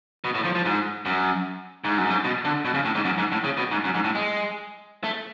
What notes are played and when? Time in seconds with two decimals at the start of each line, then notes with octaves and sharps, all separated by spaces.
0.24 B2
0.35 A2
0.45 F3
0.55 F3
0.65 G#2
1.06 F#2
1.84 G#2
1.98 F#2
2.10 G#2
2.25 B2
2.45 D3
2.65 B2
2.74 C#3
2.85 A2
2.95 G#2
3.05 F#2
3.18 G#2
3.32 A2
3.44 C#3
3.58 B2
3.71 G#2
3.84 F#2
3.95 G#2
4.04 A2
4.15 G#3
5.04 A3